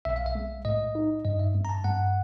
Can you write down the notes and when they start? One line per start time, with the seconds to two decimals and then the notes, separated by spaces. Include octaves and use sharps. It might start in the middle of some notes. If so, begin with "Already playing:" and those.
0.05 B1 E5
0.16 F5
0.26 E5
0.35 G#3
0.65 A2 D#5
0.95 D#4
1.25 G2 D#5
1.39 E5
1.55 G2
1.65 A#5
1.69 A5
1.84 G2 F#5